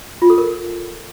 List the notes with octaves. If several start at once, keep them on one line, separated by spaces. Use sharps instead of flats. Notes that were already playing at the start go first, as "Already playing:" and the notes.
F4
A4
A#4